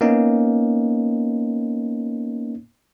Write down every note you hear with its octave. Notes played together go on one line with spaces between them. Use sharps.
A#3 B3 C#4 D#4